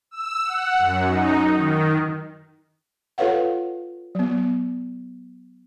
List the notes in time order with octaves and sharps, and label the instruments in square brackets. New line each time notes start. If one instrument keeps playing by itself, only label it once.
[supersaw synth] E6
F#5
F#2
D#4
D#3
[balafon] F4 A4 B4 C#5 F5 F#5
F#3 B3